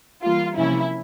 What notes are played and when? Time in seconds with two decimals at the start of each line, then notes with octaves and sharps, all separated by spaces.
0.22 E3 G3 A#3 F4
0.57 C3 F3 A#3 C#4 E4